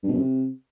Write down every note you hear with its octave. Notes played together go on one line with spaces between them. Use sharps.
G2
B2
F#2
C3